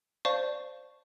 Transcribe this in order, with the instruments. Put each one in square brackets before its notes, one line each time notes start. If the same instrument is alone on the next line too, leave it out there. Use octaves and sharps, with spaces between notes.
[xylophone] C5 D5 F5 A5 C#6